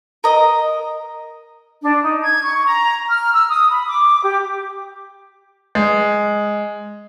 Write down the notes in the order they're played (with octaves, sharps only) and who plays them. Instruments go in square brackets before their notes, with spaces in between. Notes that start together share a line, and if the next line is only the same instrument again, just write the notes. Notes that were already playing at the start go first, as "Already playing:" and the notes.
[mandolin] A#4 D#5
[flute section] D4
D#4
G#6
C#6
A#5
F6
E6
D#6
B5
D6
G4
[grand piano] G#3